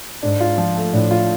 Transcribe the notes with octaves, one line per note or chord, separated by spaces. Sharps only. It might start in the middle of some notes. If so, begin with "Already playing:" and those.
G#2 D4
F4
F3
A3
A2 D4
F4